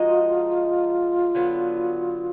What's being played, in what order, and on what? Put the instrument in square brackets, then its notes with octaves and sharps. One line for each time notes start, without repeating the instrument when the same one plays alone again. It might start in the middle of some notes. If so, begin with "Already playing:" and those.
Already playing: [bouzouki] F3 G#3 D#4 F#4 [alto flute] F4
[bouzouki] D3 F#3 B3